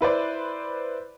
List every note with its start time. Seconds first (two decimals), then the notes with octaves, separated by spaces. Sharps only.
0.01 E4 B4 C5 D5